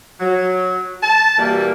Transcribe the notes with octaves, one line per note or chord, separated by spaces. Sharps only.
F#3
A5
B2 E3 G3 A#3